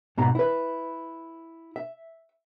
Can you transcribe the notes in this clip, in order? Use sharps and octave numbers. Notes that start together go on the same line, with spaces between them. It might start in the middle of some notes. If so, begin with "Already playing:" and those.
G#2 B2 A#5
E4 B4
E5